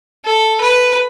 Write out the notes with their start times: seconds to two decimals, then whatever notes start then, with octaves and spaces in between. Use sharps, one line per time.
0.25 A4
0.61 B4